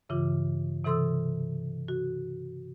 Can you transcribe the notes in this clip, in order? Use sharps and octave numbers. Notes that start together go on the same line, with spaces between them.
G2 C#3 E3 F4 D6
C3 E3 A4 C6 D#6 E6
F#4